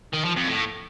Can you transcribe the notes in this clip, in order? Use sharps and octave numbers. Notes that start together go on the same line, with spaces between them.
D#3
F3
F2
A2